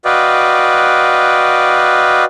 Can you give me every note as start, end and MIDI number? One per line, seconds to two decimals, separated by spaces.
0.05 2.24 66
0.05 2.24 71
0.05 2.24 74
0.05 2.24 75
0.05 2.24 77
0.05 2.24 79